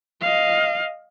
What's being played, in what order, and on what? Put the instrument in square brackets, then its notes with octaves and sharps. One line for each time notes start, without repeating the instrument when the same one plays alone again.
[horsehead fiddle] D#5 F5